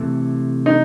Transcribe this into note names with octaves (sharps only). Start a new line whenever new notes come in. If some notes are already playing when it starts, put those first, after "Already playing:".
Already playing: C3 E3 A3
D#4